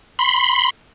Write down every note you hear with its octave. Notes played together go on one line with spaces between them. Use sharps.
B5 C6